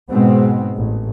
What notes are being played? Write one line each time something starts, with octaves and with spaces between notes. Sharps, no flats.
G#2 B2 G#3 B3 C4
A1